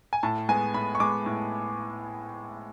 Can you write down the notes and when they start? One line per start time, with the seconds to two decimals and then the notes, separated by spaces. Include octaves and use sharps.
0.13 G#5
0.23 A2 A5
0.49 G#3 B3 G#5
0.74 A2 B5
0.95 C#6
1.00 G#3 B3 D6
1.26 A2